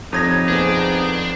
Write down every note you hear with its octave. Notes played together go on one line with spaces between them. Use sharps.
F2 D#4 G4 C#5 G#6 A#6
B3 C4 D4 G#4